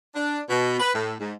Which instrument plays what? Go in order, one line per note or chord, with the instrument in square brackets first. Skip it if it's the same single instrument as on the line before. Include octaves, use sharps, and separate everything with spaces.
[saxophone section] D4
B2
B4
A2
G#2